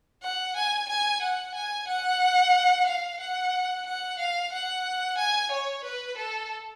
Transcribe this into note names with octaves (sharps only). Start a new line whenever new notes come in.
F#5
G#5
G#5
F#5
G#5
F#5
F5
F#5
F#5
F5
F#5
G#5
C#5
B4
A4